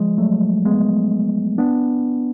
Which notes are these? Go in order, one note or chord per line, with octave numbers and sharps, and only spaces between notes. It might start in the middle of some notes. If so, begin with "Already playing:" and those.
Already playing: F3 G#3
F#3 A3
G#3 B3
B3 D4